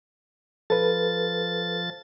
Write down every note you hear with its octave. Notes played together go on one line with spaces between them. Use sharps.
F3 A4 B4 A6